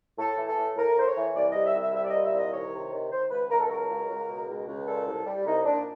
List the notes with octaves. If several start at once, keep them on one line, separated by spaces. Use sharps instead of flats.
A2 A4
E3
A4
A2
A2 A#4
A2 C5
C#5
E3
C2 D5
G3 D#5
E5
C2
E5
G3 E5
D5
A#2 D#5
E5
C2 D#5
D#3 C#5
C3
D#3
D#3 C5
C#2 B4
C#2 A#4
A4
F#3 A#4
C#2
C#2
B2
C#2
C#2
A#2 A4
C2
G3
C2 D#4
A#2 D4